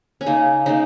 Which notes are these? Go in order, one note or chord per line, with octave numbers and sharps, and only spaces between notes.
C#4
C#3 A#3 D#4
C#3 A#3 D#4